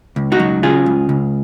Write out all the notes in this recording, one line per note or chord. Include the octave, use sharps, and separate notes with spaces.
C#2
D#4 F#4
F#3
C#3 F4 G#4
C#2
C#2